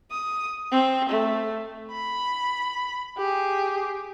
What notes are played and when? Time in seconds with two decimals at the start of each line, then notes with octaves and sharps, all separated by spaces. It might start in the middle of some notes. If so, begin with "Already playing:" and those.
0.11 D#6
0.71 C4
1.09 A3
1.92 B5
3.18 G4 G#4